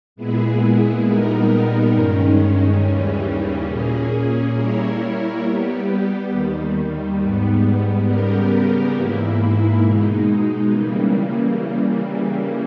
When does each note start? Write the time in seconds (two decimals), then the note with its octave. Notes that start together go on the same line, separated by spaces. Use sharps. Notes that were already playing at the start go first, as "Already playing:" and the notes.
0.16 A#2 G#3 B3 E4 G#4
1.03 A#2 G3 B3 D#4 A#4
1.91 G2 D#3 G#3 C#4
2.79 D#2 C#3 E3 G3 C#4
3.66 A#2 A#3 C#4 G#4
4.54 G3 A#3 E4 A#4 C#5
5.41 G3 B3 G4
6.29 D#2 D#3 G3
7.17 G#2 G3 B3
8.05 C#3 G3 B3 G4 A#4
8.93 G#2 E3 A#3 E4
9.80 B2 G#3 D#4
10.68 C#3 E3 G3 A#3